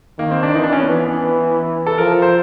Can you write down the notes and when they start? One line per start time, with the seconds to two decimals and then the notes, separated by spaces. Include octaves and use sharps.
0.18 D#3 A#3
0.31 C4
0.43 D4
0.55 E3 D#4
0.64 D4
0.73 C#4
0.82 B3
0.91 E3
1.86 A4
1.98 F3 A#4
2.22 C5